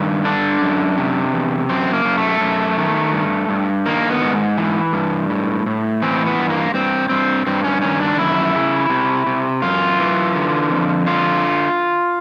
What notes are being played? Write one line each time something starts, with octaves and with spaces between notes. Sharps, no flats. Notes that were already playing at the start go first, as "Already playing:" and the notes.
Already playing: G2 D#3
D3 D4
F#2
C3
E2
F#2 C4
A#3
F#2
A3
F#2
D#3
G2
G2
D#3 A#3
B3
G#2
E3
G2
A2
A2
E3 C4
B3
G2
A#3
G2 C4
G2 C4
G2 C4
C#4
D#3 C#4
D4
F#2 E4
C#3
C3
C3
F#2 F4
E3
D3
F2
D3 F4